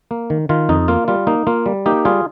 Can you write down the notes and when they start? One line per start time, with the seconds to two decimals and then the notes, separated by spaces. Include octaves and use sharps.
0.11 A#3
0.30 D#3
0.49 D#3 F4
0.69 F2 D#4
0.88 A#3 F4
1.08 G3 F4
1.27 A#3 D#4
1.47 A#3 F4
1.66 G3
1.86 A#3 D#4 G4
2.05 G3 F4 G#4